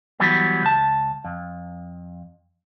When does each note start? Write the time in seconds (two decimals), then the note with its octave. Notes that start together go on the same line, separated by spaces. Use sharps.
0.20 E3 F#3 G3 B3
0.62 C#2 A5
1.25 F2